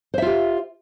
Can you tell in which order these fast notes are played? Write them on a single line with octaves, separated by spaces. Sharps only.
C5 E5 F4 G4